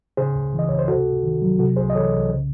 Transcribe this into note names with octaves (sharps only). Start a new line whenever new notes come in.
C#3 G#4 C5
C#2
E3 D#5
C#2 C#5
C5
C3 F#4 A4
C#2
D#3
F#3
C3 F#4 A4
C2 G#4 C5
D#5
E3 A4 C#5
C2
C#3